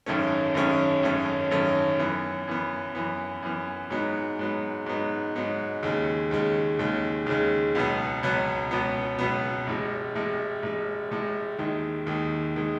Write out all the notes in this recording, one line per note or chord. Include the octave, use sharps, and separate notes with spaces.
G#1 F#2 D#3 A3 C#4
G#1 F#2 D#3 A3 C#4
G#1 F#2 D#3 A3 C#4
G#1 F#2 D#3 A3 C#4
F#2 E3 B3
F#2 E3 B3
F#2 E3 B3
F#2 E3 B3
G#2 F#3 B3 D#4
G#2 F#3 B3 D#4
G#2 F#3 B3 D#4
G#2 F#3 B3 D#4
D#2 C#3 G#3
D#2 C#3 G#3
D#2 C#3 G#3
D#2 C#3 G#3
C#2 B2 F#3 B3
C#2 B2 F#3 B3
C#2 B2 F#3 B3
C#2 B2 F#3 B3
A1 A2 G#3
A1 A2 G#3
A1 A2 G#3
A1 A2 G#3
D#2 D#3 G#3
D#2 D#3 G#3
D#3 G#3